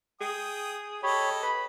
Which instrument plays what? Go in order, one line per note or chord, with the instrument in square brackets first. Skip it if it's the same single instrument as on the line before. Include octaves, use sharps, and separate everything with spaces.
[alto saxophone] G#4 [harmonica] G5 D#6
[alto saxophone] G4 [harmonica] A4 D#5 [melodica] C#5 B5
[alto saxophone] B4 [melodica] B5